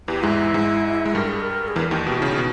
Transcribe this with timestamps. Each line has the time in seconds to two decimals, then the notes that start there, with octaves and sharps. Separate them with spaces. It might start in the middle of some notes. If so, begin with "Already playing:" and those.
0.08 E2 E3 G4
0.23 G#2 G#3 E4
0.54 G#2 G#3
1.06 G#3
1.15 G2 G3 A#4
1.28 G#4
1.40 A#4
1.68 G#4
1.76 E2 E3 A#4
1.91 D#2 D#3 G4
2.06 B2 G4
2.19 C#3 E4
2.30 D#4
2.37 B2